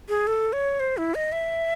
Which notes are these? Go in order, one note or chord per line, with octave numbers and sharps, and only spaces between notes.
G#4
A4
C#5
C5
E4
D#5
E5